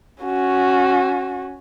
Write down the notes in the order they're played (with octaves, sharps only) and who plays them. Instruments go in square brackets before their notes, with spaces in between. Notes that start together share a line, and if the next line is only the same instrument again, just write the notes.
[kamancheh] C#4 F#4